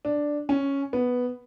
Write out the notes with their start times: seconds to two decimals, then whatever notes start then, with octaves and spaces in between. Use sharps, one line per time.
0.05 D4
0.49 C#4
0.93 B3